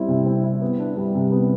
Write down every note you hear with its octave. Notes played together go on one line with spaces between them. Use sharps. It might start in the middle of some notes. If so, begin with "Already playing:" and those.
Already playing: G3 C4 E4
C3
C4
E4
B3
D4
G3
C3
B3